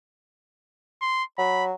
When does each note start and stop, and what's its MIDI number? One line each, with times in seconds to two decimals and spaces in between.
1.01 1.24 84
1.38 1.74 54
1.38 1.64 83